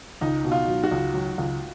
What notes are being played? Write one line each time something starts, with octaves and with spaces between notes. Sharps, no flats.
C#2 D#4
B2
F4
F#3
F#4
C#2
F#3
C#2